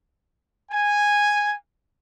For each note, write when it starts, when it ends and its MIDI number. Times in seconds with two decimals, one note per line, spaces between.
0.71 1.55 80